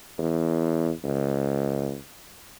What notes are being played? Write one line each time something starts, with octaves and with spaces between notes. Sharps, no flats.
E2
C#2